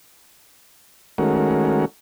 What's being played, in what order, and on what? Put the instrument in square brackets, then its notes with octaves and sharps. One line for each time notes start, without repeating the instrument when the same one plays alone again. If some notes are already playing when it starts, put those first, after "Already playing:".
[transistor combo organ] D#3 G#3 A3 C#4 F#4 A#4